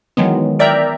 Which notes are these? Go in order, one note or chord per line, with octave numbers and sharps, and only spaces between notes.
D#3 E3 F#3 G#3 B3
A#4 D5 E5 G5 A#5